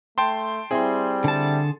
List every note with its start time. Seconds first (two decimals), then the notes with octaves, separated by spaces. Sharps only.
0.18 A3 G5 A5 C6
0.71 G3 C4 E4 G#4 C6
1.24 D3 A5